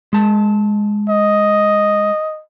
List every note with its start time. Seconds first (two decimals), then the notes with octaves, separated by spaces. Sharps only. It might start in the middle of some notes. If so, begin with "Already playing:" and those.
0.13 G#3 A5
1.09 D#5